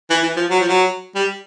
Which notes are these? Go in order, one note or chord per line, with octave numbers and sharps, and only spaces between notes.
E3
E3
F3
F#3
F3
F#3
G3